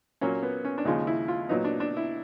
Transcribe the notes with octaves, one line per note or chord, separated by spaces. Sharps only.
A#2 F#3 A#3 C#4
B3
C#4
D4
D#2 C#3 F3 G#3 D#4
E4
F4
A#2 F#3 B3 D#4
D4
D4
E4